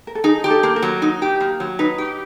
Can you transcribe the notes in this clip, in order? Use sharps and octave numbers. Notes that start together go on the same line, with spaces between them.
A#4
A4
D#4 G#4
G4
A4
A#3
A#4
F#3
D#4
G4
A#3
F#3
D#4 B4
G4